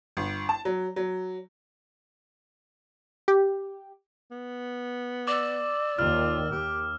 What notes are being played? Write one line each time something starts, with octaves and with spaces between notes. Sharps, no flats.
G1
A5
F#3
F#3
G4
B3
D5 D6 E6
D#2 D#3 F4 F6
D#2 G4